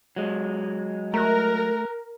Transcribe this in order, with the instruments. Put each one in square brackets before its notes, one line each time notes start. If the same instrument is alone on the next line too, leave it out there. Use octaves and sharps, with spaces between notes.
[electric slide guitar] F#3 G#3
[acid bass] A3 [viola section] A#4 [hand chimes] A#5 F#6